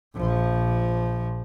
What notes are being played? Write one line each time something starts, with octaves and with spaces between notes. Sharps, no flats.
A#1 F3